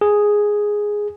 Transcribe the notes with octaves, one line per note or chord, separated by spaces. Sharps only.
G#4